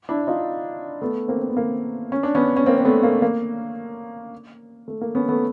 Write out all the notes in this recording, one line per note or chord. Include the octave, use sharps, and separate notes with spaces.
D4 E4
D#4 F4
A3 B3
A#3 C4
C4
B3
A#3
C#4
D4
B3 C#4
C#4
A#3 C4
C4
A3 B3
A#3
A#3
A3
A#3
B3 C#4
A3 B3